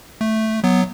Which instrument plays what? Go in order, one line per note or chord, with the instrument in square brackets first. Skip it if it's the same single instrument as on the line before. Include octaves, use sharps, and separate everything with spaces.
[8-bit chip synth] A3
F#3 B3